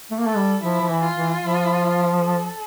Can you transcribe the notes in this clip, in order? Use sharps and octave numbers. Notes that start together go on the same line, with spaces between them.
A3
A#3
A3 A4
G3
F3 E4
F3
E3
F4
E3
F3
A4